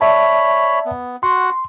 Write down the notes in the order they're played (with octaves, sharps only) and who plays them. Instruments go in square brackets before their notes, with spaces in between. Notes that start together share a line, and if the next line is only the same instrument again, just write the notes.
[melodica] C#5 B5 [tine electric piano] D5 E5 A5
[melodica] B3
[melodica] F#4 F#5 [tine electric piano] C6